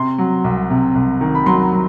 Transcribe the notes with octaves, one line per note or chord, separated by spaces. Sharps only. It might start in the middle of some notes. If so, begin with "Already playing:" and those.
Already playing: C3 C6
F#3
C2
C3
C2
D#3
B5
F#3 C6
F#3